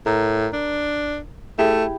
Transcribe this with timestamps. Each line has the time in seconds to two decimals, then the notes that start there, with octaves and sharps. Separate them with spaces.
0.06 A2 A#4
0.53 D4
1.59 A3 E4 G4 G#4